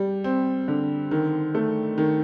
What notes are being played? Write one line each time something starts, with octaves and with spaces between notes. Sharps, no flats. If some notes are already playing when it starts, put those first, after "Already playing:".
Already playing: G3
C4
D3
D#3
A3
D#3